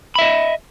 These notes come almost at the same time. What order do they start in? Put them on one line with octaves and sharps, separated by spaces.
B5 E5 D#5